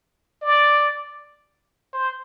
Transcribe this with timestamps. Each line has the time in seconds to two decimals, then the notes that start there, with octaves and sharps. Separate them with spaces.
0.42 D5
1.93 C5